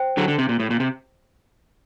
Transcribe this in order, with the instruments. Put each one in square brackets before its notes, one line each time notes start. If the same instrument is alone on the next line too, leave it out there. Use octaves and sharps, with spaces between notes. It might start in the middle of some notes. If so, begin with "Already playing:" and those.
Already playing: [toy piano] C5 G5
[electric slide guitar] D3 F#3
D3
C3
A#2
A2
A#2
C3